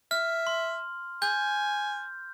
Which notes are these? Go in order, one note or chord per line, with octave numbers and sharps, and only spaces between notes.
E5 F6
C6
G#5 G6